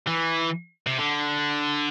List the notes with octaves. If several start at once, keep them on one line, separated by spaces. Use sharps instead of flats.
E3
C3
D3